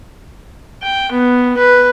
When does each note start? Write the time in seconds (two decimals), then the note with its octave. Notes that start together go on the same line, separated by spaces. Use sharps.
0.83 G5
1.12 B3
1.57 B4